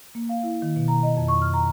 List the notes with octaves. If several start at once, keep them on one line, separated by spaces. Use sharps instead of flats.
A#3
F5
E4
D#3
B2
A#5
D#5
F2
C#6
F6
A#5